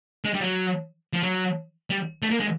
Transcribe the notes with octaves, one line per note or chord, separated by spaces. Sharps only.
G#3
G3
F#3
F3
F#3
G3
A3
A#3
G#3